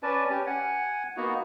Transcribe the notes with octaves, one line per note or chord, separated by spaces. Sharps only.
C#4 B4 D5 A5
C#4 G4
F#5 G#5
A#3 B3 D#4 F#4